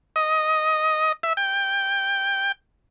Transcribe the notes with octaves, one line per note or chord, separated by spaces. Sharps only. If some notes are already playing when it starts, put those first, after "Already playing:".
D#5
E5
G5